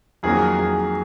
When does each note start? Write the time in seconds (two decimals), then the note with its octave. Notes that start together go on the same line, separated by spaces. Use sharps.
0.23 F2 D#3 F#3 A#3 G#4
0.59 G#4